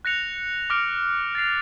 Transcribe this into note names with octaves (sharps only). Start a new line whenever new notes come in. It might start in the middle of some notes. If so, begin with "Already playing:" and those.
F#6 A#6 C#7 F7
D6 F6 A#6 D7
A6 C7 F7